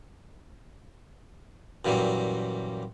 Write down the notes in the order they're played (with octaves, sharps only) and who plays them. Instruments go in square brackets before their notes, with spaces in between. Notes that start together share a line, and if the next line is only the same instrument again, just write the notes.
[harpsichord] F#2 A#2 E3 F#3 G3